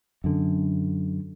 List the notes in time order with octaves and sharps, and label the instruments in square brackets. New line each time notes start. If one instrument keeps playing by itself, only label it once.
[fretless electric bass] F#2 D3